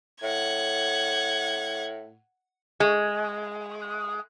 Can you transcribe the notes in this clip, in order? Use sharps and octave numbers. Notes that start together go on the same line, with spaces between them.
A2 F#5 G#6
G#3